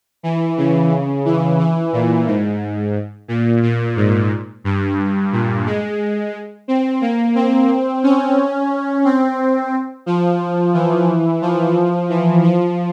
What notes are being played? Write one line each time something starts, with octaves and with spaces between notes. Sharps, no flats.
E3
C#3
E3
E3
A#2
G#2
A#2
A#2
G#2
G2
A#2
G#3
C4
A#3
C4
C#4
C4
F3
E3
F3
E3
F3